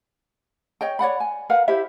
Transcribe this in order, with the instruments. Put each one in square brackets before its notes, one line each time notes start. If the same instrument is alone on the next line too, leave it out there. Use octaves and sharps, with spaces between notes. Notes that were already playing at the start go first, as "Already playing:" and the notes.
[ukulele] C#5 D#5 G5
C#5 D5 F#5 B5
G#5
A#4 B4 F5 F#5
E4 G4 C5 E5